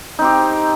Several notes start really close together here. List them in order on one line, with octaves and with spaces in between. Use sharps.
D#4 C4 G4